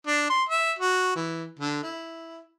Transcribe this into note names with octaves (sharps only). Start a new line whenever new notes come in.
D4
C6
E5
F#4
E3
D3
E4